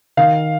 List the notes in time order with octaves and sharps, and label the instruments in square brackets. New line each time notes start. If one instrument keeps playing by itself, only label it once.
[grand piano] D#3 F5